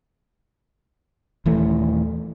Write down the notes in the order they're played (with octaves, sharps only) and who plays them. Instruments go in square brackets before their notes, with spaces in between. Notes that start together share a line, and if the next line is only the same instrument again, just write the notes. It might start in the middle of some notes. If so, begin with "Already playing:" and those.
[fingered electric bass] D#1 E3 A3